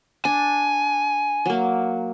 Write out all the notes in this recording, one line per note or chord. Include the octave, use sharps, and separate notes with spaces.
D4 G#5
F#3 A#3